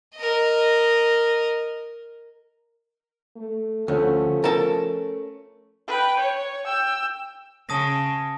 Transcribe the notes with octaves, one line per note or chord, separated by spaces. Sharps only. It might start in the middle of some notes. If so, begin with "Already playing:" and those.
A#4 D#5
A3
D2 F3 A3 C#4
A#4 A5
B4 G5
C#5
G5 E6
C#3 A5 D#6 A#6